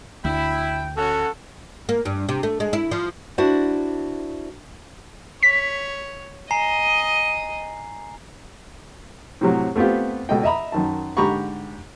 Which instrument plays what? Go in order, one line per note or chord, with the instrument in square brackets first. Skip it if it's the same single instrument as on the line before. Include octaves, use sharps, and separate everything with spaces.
[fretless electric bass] D2 [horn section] E4 [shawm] G5
[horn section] C#4 F#4 [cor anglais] A4
[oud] A#3
G2
C3
A3
G#3
E4
F3
[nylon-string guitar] D4 E4 F#4 C5 D5
[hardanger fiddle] C#5 [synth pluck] B6
[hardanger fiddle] D#5 D#6 [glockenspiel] G#5 A#5 C7
[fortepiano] A2 C3 F#3
A3 B3 C4 F4 G4
C#2 B2 A4 D#5 G5
D#5 E5 A#5 B5
F#2 D#3 A5
G#2 D3 G4 A#5 B5 C#6